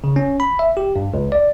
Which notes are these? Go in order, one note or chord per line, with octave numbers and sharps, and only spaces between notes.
C#3
C#4
B5
E5
G4
G2
C#2
D5